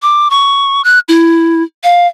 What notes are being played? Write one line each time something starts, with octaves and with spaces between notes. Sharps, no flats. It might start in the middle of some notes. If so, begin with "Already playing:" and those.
D6
C#6
F#6
E4
F5